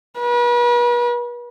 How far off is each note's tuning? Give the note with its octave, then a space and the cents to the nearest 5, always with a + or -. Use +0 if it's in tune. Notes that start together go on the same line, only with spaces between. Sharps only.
B4 -40